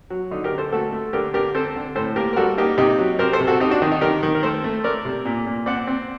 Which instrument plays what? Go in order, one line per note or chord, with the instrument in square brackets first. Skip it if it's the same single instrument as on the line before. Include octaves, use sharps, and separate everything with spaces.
[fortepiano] F#3
D3 D#4
G4 A#4
D3
A4 C5
A3 F#4 A4
A3
D3 G4 A#4
D3 G4 A#4
C4 A4 C5
D3
A2 A4 C5
A#3 G4 A#4
A#4
G3 F#4 A4
A#3 D#4 G4
C3 D#4 G4
F#3
C4 G4 A#4
A4 C5
C3
F#4 A4
C4 D#4 G4
D4 F#4
D#3 D#4
D#4
D#3 G4 A#4
D#3
A#4
A3 A4 C5
A3
A3 A#4 D5
C3
A#2
A#2
C4 D5 F#5
C4